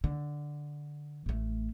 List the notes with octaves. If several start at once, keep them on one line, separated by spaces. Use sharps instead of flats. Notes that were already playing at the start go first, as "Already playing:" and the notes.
D3
A1 A3